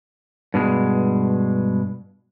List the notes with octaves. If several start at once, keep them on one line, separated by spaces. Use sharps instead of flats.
G2 B2 G#3